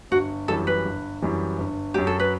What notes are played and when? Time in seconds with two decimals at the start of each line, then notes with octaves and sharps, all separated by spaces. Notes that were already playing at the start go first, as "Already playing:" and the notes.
0.11 G1 F#4
0.48 F#2 E3 G3 A4
0.67 B4
0.85 G1
1.22 F#2 E3 G3
1.58 G1
1.94 F#2 F#3 G4
2.07 A4
2.20 B4